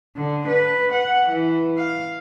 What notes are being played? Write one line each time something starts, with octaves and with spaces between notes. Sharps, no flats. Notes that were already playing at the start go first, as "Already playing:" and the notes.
D3
B4
F#5
E3
F5